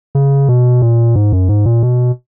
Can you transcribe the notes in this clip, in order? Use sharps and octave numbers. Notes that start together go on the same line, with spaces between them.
C#3
B2
A#2
G#2
F#2
G#2
A#2
B2